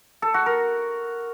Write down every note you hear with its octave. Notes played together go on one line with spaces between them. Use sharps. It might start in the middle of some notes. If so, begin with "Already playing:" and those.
A4
F#4
A#4